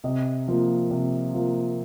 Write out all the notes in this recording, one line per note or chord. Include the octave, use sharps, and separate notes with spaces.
C3 D#5
F3 A#3
C3
F3 A#3